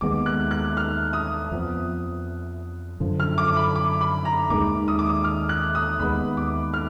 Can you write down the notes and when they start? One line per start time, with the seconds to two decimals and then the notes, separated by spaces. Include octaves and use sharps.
0.01 D#2 D#3 G#3 B3 D6
0.26 F#6
0.51 F#6
0.77 F6
1.13 D#6
1.51 F2 F3 B3
3.00 F#2 D3 F3
3.20 F6
3.38 D6
3.57 B5
3.76 D6
4.01 B5
4.25 A#5
4.50 D#2 D#3 G#3 D6
4.88 D#6
4.99 D6
5.09 D#6
5.24 F6
5.49 F#6
5.75 D#6
6.00 D#2 D3 G#3 B3 B5
6.37 D6
6.74 F6